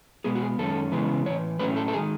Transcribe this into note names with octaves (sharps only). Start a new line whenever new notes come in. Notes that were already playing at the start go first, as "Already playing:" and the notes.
B2 G#3 B3 G#4
F#4
G#4
F#2 D#3 G#3 C#4 A4
C#3 E3 G#3 B3
A2 E3 B3 C#5
A2 F#3 A3 C#4 B4
A4
A4
D#3 G#3 G#4